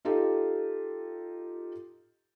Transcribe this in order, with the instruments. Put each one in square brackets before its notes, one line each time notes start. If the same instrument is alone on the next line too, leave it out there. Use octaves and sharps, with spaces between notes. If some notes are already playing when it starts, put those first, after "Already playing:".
[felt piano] D#4 F4 G4 A4